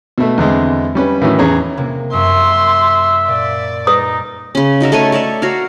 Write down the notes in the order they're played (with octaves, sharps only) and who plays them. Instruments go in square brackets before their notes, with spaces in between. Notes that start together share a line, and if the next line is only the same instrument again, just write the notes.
[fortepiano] B2 A3
E2 D3 G#3 C4
G3 C#4 B4
A2 D#3 E3 F#3 C#4
E2 C#4 G#4 C#5 A#5
[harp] C3 A#3
[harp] F#2 A#3 [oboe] E5 [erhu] C6
[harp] A#2 [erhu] D5
[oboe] D#4 [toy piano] B4 D#6 [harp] A#5
[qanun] C#3 C#4
D#4 F#4 A#4 E5
A3 A4 C#5 G#5
A4 C#5 D5 E5
F#4 A#4 C#5 F5